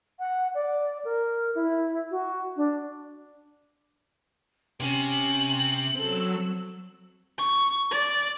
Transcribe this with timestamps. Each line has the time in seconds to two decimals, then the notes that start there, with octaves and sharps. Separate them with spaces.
0.19 F#5
0.54 D5
1.05 A#4
1.55 E4
2.11 F#4
2.56 D4
4.80 C3 C#4 F#7
5.94 F#3 C4 A4 E6
7.38 C#6
7.91 D5